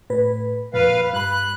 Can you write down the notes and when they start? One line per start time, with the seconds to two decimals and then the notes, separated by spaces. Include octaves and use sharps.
0.10 A2 B4
0.74 F2 A#2 B4 F5
1.13 G2 B5 F#6